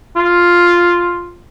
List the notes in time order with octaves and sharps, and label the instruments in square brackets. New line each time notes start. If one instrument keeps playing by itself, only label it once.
[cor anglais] F4